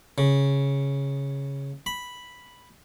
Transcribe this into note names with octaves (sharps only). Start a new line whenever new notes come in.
C#3
B5